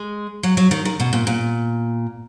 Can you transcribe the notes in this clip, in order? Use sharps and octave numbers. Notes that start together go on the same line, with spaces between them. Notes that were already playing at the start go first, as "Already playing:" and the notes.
Already playing: G#3
F#3
F#3
D#3
D#3
B2
A#2
A#2